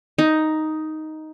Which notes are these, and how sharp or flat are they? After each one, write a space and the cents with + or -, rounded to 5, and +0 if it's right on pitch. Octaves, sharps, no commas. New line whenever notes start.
D#4 +5